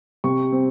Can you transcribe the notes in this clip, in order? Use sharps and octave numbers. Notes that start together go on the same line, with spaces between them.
C3 C#6
C4